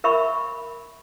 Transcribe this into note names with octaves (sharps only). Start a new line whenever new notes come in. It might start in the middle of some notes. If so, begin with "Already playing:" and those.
A#4 E5 B5 C#6